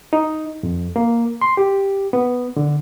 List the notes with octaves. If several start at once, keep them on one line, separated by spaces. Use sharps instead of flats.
D#4
F2
A#3
C6
G4
B3
D3